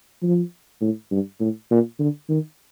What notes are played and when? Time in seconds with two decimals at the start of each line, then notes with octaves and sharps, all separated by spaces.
0.22 F3
0.81 A2
1.11 G2
1.40 A2
1.71 A#2
1.99 D3
2.29 D#3